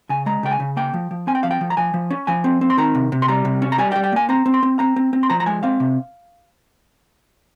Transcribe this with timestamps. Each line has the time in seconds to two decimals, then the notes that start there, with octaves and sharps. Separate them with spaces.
0.09 C#3 G#5
0.26 G#3 A#5
0.43 C#3 G5
0.51 G#5
0.60 C#3
0.77 A#3 G5
0.94 F3
1.11 F3
1.27 C4 G#5
1.35 G5
1.43 F3 F5
1.51 G5
1.61 F3
1.70 A#5
1.77 F3 G#5
1.94 F3
2.10 C#4
2.27 F3 G#5
2.44 C4
2.61 C4
2.70 C6
2.78 D#3 A#5
2.95 C3
3.12 C3
3.22 C6
3.28 G3 A#5
3.45 C3
3.62 C#4
3.72 A#5
3.78 G3 G#5
3.92 G5
3.96 G3
4.04 G5
4.12 A#3 G#5
4.29 C4 A#5
4.46 C4
4.54 C6
4.63 C4
4.79 C4 A#5
4.96 C4
5.13 C4
5.23 C6
5.30 F3 A#5
5.40 A#5
5.46 G#3 G#5
5.63 C4 F5
5.80 C3